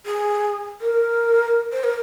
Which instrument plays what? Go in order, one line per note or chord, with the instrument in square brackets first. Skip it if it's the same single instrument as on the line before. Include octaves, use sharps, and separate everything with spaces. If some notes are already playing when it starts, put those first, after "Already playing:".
[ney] G#4
A#4
C5
A#4